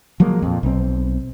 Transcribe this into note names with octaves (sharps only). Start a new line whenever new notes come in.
F3 F#3 G#3 A#3
F2 A#2
B1 C4